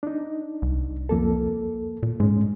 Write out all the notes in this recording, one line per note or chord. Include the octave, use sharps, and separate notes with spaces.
D4 D#4
C2
F2 A#3 A4
A#2
G#2 G#3 C#4